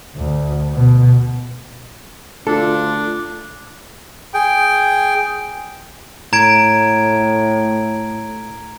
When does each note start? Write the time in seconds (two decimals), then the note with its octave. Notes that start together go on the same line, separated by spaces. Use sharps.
0.15 D2
0.74 B2
2.47 D2 D4 F4 A4
4.34 G#4 G5
6.33 A2 A#5 G#6 D7